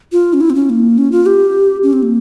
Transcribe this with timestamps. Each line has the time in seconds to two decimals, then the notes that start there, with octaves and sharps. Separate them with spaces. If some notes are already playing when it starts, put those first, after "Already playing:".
0.12 F4
0.34 C#4
0.41 E4
0.50 C4
0.55 C#4
0.70 A#3
0.98 C#4
1.12 F4
1.26 G4
1.83 C#4
1.93 C4
2.03 A#3